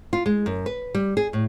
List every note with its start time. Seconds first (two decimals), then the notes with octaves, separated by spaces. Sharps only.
0.13 F4
0.26 G#3
0.46 F#2
0.66 B4
0.95 G3
1.17 G#4
1.33 A2